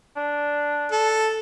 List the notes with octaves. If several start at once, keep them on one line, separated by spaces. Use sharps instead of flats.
D4
A4